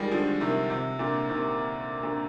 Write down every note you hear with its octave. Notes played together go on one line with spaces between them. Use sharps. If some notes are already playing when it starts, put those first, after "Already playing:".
Already playing: D#3 F3 G3 G#3
D3 F3
C3 D#3
C3
A#2 D3
C3 D#3
A#2 D3